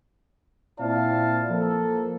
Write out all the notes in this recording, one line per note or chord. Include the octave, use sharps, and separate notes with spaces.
A#2 C4 E4 D5 F5 A5
F3 A#3 A4